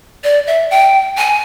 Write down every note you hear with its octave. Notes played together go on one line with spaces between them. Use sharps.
D5
E5
G5
G#5